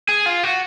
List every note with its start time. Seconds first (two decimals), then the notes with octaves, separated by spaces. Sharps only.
0.09 G#4
0.26 F4
0.43 F#4